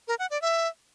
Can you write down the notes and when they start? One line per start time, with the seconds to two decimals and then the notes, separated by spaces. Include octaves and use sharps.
0.08 A#4
0.19 F#5
0.30 D5
0.42 E5